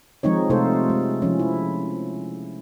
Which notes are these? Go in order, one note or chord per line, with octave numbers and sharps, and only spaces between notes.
F3 G#3 C4 D#4 C#5
C3 A3 D#4 F4 A4 C5
G#3
F3 C#4
E4